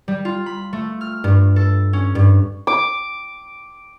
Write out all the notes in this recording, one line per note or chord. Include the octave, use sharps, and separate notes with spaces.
G3
F4
B5
A3
F6
G2
A4
C#4
G2
D6